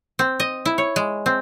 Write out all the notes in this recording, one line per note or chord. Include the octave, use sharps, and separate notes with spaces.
C4
D#5
E4
C#5
G#3
C4